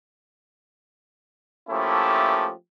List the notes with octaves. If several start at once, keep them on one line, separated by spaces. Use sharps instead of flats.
F3 A3 A#3 C#4 E4 G4